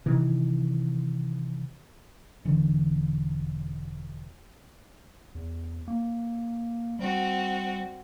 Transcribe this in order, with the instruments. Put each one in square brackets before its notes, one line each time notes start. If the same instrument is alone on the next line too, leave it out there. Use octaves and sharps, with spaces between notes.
[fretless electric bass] C3 D#3 E3
[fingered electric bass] E1 D3 E3
[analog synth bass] E2
A#3
[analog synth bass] G3 [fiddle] C4 F#4